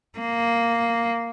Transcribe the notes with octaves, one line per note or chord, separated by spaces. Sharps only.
A#3